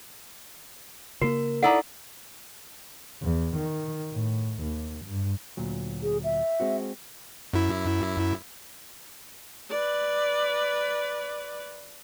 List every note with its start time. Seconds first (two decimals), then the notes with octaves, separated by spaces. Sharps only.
1.22 C#3 A#3 F#4 A#4
1.63 D#4 E4 A4 D5 F#5
3.23 E2
3.56 D#3
4.13 A2
4.62 D#2
5.05 G2
5.57 D2 A#2 F#3
6.03 G#4
6.24 E5
6.60 G#3 C4 F#4
7.53 F#2 E4
9.70 B4 D5